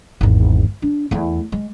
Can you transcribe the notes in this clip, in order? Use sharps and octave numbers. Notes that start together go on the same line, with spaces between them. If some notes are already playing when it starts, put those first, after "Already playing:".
G#1 E2
D4
E2 A3
G#3